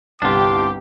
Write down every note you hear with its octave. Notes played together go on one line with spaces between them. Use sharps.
G1 C2 D4 F4 G4 D6